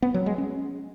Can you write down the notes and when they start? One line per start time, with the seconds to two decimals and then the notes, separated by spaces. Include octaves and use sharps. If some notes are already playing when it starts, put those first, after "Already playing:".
0.02 B3
0.14 F#3
0.26 G#3
0.38 C#4